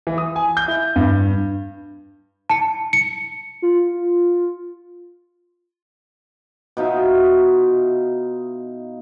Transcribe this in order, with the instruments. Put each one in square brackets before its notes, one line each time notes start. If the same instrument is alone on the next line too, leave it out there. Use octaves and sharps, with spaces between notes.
[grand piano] E3
D#6
G#5
G6
E4
G2
[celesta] A5 C#7
C#7
[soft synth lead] F4
[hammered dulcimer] B2 D#4 F4 E5